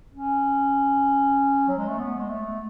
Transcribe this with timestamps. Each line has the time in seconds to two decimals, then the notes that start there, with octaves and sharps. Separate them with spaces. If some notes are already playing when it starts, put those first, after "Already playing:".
0.14 C#4
1.68 F#3
1.78 G#3
1.88 A3
1.99 B3
2.18 G#3
2.29 A3